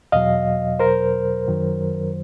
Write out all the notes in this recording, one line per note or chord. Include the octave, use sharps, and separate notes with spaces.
E2 B2 F#3 D#5 F5
A#4 C5
F#2 D#3 F#3